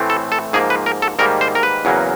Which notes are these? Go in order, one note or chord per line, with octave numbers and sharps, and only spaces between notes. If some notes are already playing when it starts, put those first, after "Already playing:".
Already playing: A2 E3 A3 C4
A4
A4
G#2 F3 A#3 G#4
B4
A#4
A4
G#2 D#3 G3 A#3 A#4
C5
A#4
B4
E2 C#3 F#3 A#3